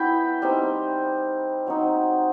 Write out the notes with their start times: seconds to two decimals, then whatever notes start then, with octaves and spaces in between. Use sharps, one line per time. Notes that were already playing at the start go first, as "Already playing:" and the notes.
Already playing: F#3 B3 E4 E5 G5 B5
0.42 G3 C4 D#4
1.67 F#3 C4 D#4